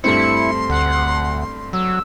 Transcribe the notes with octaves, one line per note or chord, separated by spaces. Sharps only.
G2 A3 C4 E4 C6 C#7
D2 F#5
F#3 E6